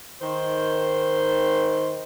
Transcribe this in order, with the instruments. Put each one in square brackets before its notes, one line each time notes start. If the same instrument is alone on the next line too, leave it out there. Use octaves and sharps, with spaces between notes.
[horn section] D#3 C5